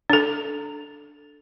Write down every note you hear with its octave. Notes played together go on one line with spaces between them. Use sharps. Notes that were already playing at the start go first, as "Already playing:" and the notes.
D4 A4